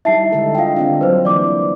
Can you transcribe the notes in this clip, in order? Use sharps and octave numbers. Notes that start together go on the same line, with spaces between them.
G3 D#4 E4 E5 A5 C7
D3 G#3 A4
F4 D#5 F5 G5
D3 C4 D4
F#3 G3 B4 C5
E3 A#3 E4 D5 D6